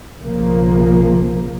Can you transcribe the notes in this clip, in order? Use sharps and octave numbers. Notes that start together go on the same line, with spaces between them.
B1 C#3 F3 A#3